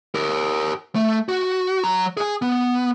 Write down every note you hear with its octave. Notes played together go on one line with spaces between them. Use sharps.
G4 A#4
A3
F#4
F#3 A#5
G#4 G#5
B3